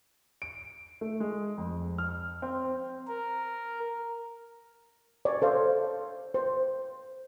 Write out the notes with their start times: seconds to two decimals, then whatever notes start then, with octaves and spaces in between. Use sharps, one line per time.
0.42 D7
1.01 A3
1.20 G#3
1.58 F2
1.98 F6
2.42 C4
3.08 A#4
5.25 C#5 D5
5.42 A4 C5 F5
6.34 C5